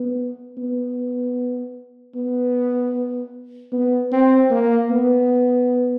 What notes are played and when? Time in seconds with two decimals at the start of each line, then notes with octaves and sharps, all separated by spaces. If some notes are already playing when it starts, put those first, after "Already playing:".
Already playing: B3
0.58 B3
2.15 B3
3.73 B3
4.12 C4
4.51 A#3
4.91 B3